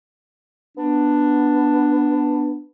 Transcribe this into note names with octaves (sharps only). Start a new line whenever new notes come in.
B3 D4